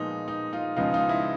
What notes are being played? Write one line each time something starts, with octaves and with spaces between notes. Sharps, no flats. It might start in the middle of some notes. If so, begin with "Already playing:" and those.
Already playing: A#2 F3 G#3 B3 D#4
D#4
D#4 F4
C#2 C#3 F3 G#3 B3 D#4 F4
D#4 F4
E4